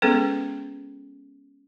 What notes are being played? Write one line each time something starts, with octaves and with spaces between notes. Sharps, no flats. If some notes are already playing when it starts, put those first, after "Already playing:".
G#3 B3 C#4 G#4 A4 B4